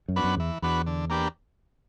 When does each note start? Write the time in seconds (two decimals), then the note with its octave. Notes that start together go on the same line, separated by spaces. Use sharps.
0.08 F#2
0.16 B3 D4 F#4 B4
0.24 F#2
0.36 E2 E3
0.62 E2 B3 D4 F#4 B4
0.87 D3
1.10 A#3 D4 G4 B4